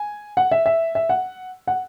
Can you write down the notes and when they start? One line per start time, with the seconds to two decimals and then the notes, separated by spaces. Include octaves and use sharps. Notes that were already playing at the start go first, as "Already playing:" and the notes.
Already playing: G#5
0.37 F#5
0.51 E5
0.66 E5
0.95 E5
1.09 F#5
1.67 F#5